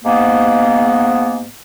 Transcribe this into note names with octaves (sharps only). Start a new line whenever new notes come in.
G#2 A#3 B3